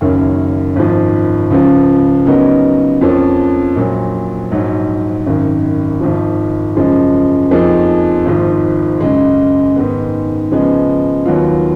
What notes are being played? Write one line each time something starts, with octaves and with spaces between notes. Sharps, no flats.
F#1 F#2 D#3 A#3 C#4
G#1 G#2 F3
C#2 C#3 F3
C#3 F#3 B3 D#4 A#4
F2 F3 A#3 C#4
A#1 A#2 F#3
A#1 G#2 F#3
G#1 F#2 D#3
G#1 G#2 F3
F#2 C#3 F3 G#3
F2 F3 A#3 D#4 G#4
G#1 G#2 F3
F#2 C#3 G#3
G#2 D#3 G#3 B3
C#3 F3 G#3 B3
D#2 D#3 F#3 B3 F4